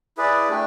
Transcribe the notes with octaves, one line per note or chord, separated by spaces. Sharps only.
E4 G#4 B4 D5
A3 D4 G4